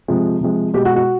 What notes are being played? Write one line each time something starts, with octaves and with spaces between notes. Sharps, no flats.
C3 F3 G#3
C3 F3 G#3
B2 G#3 G4
F#4
F#4